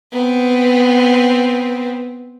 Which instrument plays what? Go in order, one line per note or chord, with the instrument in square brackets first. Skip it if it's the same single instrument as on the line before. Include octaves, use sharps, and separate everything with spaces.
[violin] B3 C4